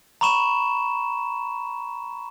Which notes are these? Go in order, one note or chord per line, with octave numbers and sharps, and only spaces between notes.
A#5 B5 C#6 E7